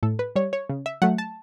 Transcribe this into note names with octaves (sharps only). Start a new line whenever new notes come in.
A2 A4
B4
G3 C#5
C#5
C#3
E5
F#3 A3 F#5
A5